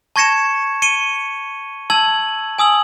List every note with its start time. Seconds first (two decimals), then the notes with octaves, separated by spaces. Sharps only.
0.16 A5 C#6 G#6 A#6 C#7 E7
0.82 C#7 D#7 G7
1.90 A5 E6 G#6 F#7
2.59 G#5 D#6 E6 F#7